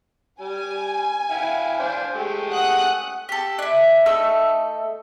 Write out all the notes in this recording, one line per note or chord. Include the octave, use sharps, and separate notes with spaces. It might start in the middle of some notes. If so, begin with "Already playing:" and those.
G3 G#5
E4 F5 G5
D4 C5 F5
G#3 A3 G4
F#5 D#6 F#6
G4 A4
D4 E4
A3 D#4 A4 E6